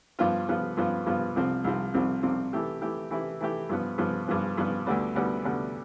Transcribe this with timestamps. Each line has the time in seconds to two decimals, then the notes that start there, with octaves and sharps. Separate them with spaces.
0.19 G2 F3 B3 F4
0.48 G2 F3 B3 F4
0.77 G2 F3 B3 F4
1.06 G2 F3 B3 F4
1.36 C2 C3 F3 C4
1.64 C2 C3 F3 C4
1.94 C2 C3 F3 C4
2.23 C2 C3 F3 C4
2.53 E3 A3 E4 G4
2.81 E3 A3 E4 G4
3.11 E3 A3 E4 G4
3.41 E3 A3 E4 G4
3.69 G2 F3 B3
3.98 G2 F3 B3
4.28 G2 F3 B3
4.57 G2 F3 B3
4.87 D2 D3 G3 B3
5.15 D2 D3 G3 B3
5.44 D2 D3 G3 B3